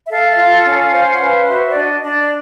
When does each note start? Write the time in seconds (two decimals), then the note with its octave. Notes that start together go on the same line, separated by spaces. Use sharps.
0.05 E5
0.09 A4 F5
0.30 E5
0.36 F4 F5
0.64 C#4
0.91 C5
1.13 F#5
1.18 B4 F5
1.47 F#4 E5
1.69 D5
1.73 D4 D#5
2.01 D4 D5